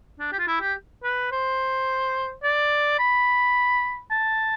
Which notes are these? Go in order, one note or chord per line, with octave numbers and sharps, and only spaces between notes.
D4
G4
F4
E4
G4
B4
C5
D5
B5
A5